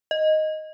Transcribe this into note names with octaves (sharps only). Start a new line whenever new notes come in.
D#5